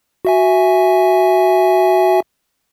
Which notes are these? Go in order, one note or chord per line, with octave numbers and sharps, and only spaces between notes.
F#4 E5 G#5